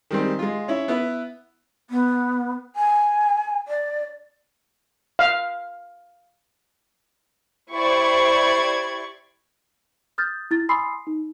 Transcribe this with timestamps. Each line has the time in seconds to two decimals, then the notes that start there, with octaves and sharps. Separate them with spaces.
0.11 D#3 G3 G#3 C4
0.39 G#3 F4
0.68 C#4 E4
0.88 B3 E4 B4
1.90 B3
2.76 G#5
3.68 D5
5.19 F5
7.75 E4 G4 C5 D5 C#6 G#6
10.18 D#6 F6 G6 A6
10.51 E4 A6
10.69 G#5 B5 C6 D#6 E6 C7
11.07 D#4